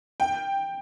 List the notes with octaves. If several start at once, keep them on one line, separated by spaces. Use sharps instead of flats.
G5